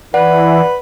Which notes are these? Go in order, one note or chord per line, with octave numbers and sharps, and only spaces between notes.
E3 B4 D5 F#5